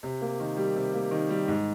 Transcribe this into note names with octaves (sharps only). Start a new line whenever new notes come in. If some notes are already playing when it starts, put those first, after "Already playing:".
C3
A#3
D#3
G3
C3
A#3
D#3
G3
G#2